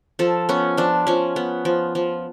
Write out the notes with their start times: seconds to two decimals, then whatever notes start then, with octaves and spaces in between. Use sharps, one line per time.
0.19 F3 A4
0.49 B3 C#4
0.77 F3 D4
1.07 F3 C#4
1.36 B3
1.65 F3
1.95 F3